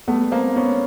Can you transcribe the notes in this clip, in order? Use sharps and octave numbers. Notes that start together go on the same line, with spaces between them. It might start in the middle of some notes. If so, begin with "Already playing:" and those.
G3 A3 B3
A#3 C4
G3
B3 C#4